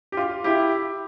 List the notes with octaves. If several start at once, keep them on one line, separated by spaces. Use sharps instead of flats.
G4
F4
E4 G4